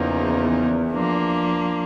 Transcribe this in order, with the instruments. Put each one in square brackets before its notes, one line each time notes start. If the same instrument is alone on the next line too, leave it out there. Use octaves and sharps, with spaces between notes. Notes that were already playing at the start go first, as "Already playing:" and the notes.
Already playing: [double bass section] E2 [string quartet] C#3 F3 A#3 D#4
[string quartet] F3 A#3 D4